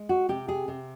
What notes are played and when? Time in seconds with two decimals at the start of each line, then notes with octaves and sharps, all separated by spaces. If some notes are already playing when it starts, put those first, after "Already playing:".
Already playing: G#3
0.09 F#4
0.29 C3 G4
0.48 G#4
0.68 C3